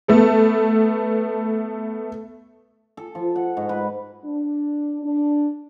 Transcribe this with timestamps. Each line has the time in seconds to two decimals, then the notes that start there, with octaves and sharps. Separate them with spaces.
0.08 A3 B3 A4
2.97 A4
3.15 F3
3.36 F#5
3.57 G#2
3.69 B4
4.25 D4
5.04 D4